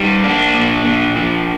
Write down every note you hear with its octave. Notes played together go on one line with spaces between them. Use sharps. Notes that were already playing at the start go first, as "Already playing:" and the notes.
Already playing: G3 D#4
A#3 D4
A#2
A#2
F3